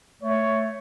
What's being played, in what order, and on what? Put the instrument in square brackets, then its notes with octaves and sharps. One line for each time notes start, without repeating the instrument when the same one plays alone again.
[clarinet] A3 [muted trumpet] C#5